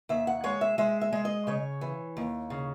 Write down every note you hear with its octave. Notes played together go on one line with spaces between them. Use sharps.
D#2 E5
F#5
G#3 C#5
E5
G#3 E5
E5
G#3
D#5
C#3 C#5
E3
D#2
C#3